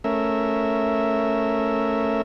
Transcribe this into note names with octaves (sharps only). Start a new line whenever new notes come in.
A3 C#4 A#4 E5